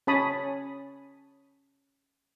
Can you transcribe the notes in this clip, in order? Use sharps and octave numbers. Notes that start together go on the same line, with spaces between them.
C#4 C#5 A5 B5 D#6